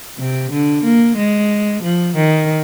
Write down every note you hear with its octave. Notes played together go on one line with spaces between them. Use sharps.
C3
D3
A#3
G#3
F3
D#3